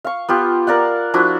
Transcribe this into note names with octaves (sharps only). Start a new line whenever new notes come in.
F5 C#6
B3 F4 G4
A#4 D5 F5 F#5
F3 D4 E4 F#4